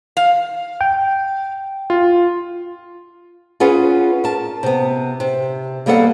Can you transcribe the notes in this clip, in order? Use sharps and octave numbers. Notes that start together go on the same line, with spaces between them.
F5
G5
F4
C#4 F4 G#4 B4 F#5
A#4 A5
C3 B3
C3
G3 A#3 B3 A4 C#5 F#5